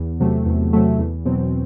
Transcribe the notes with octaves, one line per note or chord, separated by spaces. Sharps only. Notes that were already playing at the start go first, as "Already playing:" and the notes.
Already playing: E2
C3 F#3 A3
E2
C3 F#3 A3
E2
B2 F#3 C4